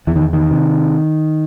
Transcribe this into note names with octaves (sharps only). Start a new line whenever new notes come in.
E2 E3
D#3
D#3
C3